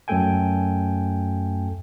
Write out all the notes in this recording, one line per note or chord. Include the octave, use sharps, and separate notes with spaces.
F#2 F#3 A3 A4 G5 G#5